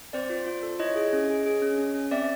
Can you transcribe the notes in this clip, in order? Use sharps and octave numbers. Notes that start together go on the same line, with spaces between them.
C4 C5 D5
F4
F4
A4
E4 C#5 D#5
G#4
C#4
G#4
G#4
C#4
C#4
C#4
C4 D5 E5